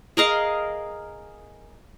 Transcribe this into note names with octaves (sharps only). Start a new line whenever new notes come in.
G#4 A#4 D#5 F5